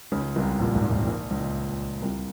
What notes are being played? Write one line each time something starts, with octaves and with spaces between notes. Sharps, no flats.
C#2 C#3
C2 C3
A#1 A#2
G#1 G#2
G#1 G#2
A#1 A#2
C#2 C#3
C2 C3